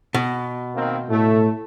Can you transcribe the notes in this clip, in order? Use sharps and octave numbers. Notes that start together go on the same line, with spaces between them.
B2
D#3 A#3 C4
A2 A3